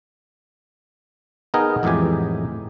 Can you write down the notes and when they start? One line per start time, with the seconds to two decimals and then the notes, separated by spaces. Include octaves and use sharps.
1.54 B3 D#4 G#4 A#4 D#5 G5
1.83 F2 A2 E3 G#3 G4 G#5